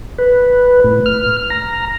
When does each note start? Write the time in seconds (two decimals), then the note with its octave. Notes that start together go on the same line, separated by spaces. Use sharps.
0.19 B4
0.84 A2
1.06 F6
1.50 A#5